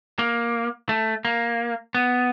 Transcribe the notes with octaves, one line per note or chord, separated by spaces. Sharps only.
A#3
A3
A#3
B3